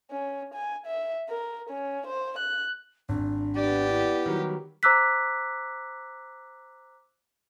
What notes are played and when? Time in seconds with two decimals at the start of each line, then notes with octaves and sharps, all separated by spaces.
0.11 C#4
0.54 G#5
0.87 E5
1.29 A#4
1.70 C#4
2.07 C5
2.38 F#6
3.09 G#1 D4
3.56 B3 G4 D5
3.88 E4
4.26 D#3 F#3 G3
4.83 C5 A#5 D6 E6 F#6 B6